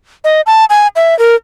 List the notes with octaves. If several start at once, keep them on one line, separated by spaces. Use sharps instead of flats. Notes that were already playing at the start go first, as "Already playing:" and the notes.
D#5
A5
G#5
E5
A#4